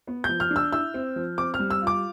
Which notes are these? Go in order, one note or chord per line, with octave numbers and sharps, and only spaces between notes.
B3
F3 G6
F6
D4
E6
E4 E6
C4
F3
C4 D6
F6
G3
E6
F4
D6